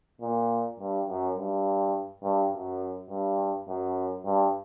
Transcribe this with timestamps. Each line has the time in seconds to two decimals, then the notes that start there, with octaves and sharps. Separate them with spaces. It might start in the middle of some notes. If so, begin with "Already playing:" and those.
0.21 A#2
0.79 G2
1.08 F#2
1.37 G2
2.23 G2
2.52 F#2
3.10 G2
3.68 F#2
4.26 G2